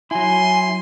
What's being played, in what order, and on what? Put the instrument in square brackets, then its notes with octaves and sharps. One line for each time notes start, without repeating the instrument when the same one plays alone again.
[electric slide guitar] F#3 E4 [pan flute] G#5 [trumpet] C6